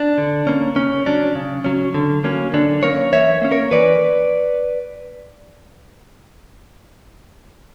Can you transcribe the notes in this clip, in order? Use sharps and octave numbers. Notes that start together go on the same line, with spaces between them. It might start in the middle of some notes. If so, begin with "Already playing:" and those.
Already playing: D4
D3
A#3 C#4
C#3 C#4
F#3 C#4 D4
C#3
F#3 C#4
D3
F#3 A#3 C#4
D3 D4
F#3 A#3 C#4 A#4 C#5
E3 C#5 E5
A#3 C#4
A#4 C#5
E3 B4 D5